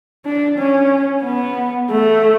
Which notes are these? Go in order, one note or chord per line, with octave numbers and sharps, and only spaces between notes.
D4
C#4
B3
A3